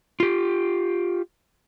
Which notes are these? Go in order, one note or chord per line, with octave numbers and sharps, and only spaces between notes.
F4 G4